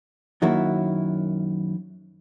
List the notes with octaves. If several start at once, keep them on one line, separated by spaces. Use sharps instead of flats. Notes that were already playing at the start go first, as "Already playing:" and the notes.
F#2 D#3 F#3 A#3 E4 F#4